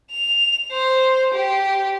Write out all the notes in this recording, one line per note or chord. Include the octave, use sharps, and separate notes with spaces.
F7
C5
G4